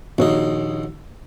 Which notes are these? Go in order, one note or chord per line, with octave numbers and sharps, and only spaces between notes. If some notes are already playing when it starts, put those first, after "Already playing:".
A#1 D#2 D#4 F#4 C#5